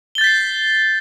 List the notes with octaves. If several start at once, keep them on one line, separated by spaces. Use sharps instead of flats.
G6 A6 B6 C7 G7